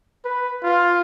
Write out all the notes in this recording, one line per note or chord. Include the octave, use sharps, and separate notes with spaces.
B4
F4